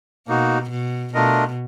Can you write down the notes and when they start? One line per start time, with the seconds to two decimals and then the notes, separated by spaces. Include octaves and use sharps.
0.28 B2 A#3 D#4 F#4
0.70 B2
1.13 B2 A3 D4 F4 A#4 D#5